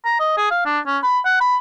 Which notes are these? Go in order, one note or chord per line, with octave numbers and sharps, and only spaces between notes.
A#5
D#5
G#4
F5
D4
C#4
B5
F#5
B5